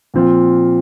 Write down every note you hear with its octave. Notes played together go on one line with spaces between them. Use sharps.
A#2 F3 C4 F4